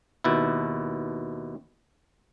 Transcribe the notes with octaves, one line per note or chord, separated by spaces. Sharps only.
D#2 B2 E4